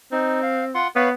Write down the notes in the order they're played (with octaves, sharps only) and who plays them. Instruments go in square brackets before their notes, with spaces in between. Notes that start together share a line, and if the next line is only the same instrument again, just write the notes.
[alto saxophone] C4 [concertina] D#4
[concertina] F5
F4 F#5 C6
[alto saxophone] B3 [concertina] B4 C#5 F5